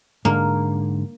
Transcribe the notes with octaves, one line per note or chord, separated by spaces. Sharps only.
G#2 D3 A#3